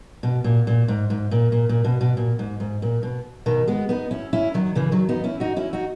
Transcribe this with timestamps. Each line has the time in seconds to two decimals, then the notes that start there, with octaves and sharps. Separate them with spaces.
0.23 B2
0.44 A#2
0.67 A#2
0.88 G#2
1.10 G#2
1.31 A#2
1.52 A#2
1.69 A#2
1.84 B2
2.01 B2
2.17 A#2
2.39 G#2
2.60 G#2
2.82 A#2
3.03 B2
3.46 B2 D#3
3.67 G#3 B3
3.89 B3 D#4
4.11 C#4 E4
4.33 C#4 E4
4.54 D#3 F#3
4.75 C#3 E3
4.92 D#3 F#3
5.09 B3 D#4
5.24 C#4 E4
5.40 D#4 F#4
5.56 C#4 E4
5.73 D#4 F#4